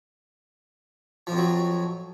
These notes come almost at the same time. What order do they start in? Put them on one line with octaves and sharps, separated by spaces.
F3 F2 F#3